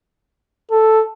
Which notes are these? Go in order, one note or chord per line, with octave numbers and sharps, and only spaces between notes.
A4